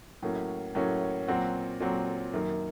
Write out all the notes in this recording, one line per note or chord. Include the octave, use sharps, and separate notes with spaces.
A2 F#3 A#3 C#4
A2 F#3 A#3 C#4
A#2 F#3 C4 F#4
A#2 F#3 C4 F#4
F#2 D#3 A#3